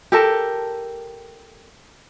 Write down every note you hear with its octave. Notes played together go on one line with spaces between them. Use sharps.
G4 A4 A#4 A5